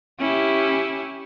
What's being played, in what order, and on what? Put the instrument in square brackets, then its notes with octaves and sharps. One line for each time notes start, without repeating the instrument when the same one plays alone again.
[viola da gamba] C#4 E4 G4